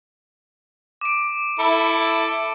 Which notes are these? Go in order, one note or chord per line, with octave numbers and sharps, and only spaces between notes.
D6 D7
E4 A4 C#7